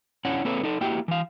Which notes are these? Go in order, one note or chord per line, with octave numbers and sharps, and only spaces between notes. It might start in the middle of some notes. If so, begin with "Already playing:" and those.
C#4 D4 E4 C#5 F#5
A#3 C4 A4 B4 C#5
D#4 A4
A#3 E4 F#4 G4 G5
E3 F5